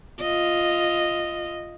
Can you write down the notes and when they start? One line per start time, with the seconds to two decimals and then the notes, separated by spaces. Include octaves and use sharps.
0.20 F4 D#5